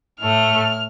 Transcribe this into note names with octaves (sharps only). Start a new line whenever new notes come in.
A2 A3 F6